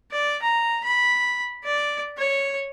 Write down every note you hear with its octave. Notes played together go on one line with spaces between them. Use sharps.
D5
A#5
B5
D5
C#5